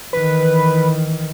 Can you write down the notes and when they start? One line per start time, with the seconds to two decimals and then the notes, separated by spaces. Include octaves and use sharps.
0.13 D#3 E3 B4